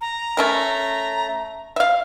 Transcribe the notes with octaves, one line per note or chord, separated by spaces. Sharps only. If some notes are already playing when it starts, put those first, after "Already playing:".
A#5
A3 C#4 A#4
E5 F5